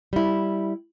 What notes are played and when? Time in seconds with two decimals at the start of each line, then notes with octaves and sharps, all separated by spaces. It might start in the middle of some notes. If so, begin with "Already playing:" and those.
0.13 G3 E4